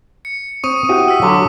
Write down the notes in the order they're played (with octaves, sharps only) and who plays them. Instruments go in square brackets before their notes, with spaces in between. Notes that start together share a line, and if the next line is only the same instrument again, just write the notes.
[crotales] C#7
[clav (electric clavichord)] C4 [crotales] C#6 D#6 D#7
[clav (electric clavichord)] E4 F#4 G4
[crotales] E6 B6
[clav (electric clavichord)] D3 F#3 [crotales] D6